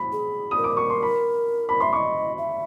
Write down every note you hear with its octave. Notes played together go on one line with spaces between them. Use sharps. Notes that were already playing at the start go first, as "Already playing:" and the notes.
Already playing: B5
G#4
D#6
A#4
D6
C#6
C6
B5
B5
E5 C6
D#5 E5 C#6
E5